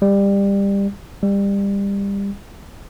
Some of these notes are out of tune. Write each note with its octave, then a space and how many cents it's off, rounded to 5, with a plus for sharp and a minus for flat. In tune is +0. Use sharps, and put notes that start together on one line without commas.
G3 +20
G3 +25